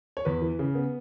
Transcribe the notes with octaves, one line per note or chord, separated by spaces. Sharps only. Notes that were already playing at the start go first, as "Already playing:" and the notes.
C#5
E2 B4
E3
C#3
B3